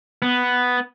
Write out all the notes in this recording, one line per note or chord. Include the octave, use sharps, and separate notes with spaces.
B3